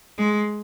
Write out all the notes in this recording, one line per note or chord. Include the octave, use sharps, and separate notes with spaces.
G#3